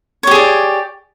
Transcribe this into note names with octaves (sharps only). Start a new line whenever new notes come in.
G4 G#4 C#5 D5